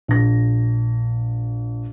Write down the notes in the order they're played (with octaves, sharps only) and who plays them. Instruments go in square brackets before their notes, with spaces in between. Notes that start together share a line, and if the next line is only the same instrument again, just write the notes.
[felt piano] A#1 A#6